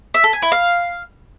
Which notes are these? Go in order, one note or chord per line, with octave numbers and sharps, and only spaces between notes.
E5
A4
G#5
E4
F5